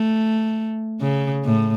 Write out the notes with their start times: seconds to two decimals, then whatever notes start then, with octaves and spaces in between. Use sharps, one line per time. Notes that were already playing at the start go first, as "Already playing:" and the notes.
Already playing: A3
1.01 C#3
1.44 A2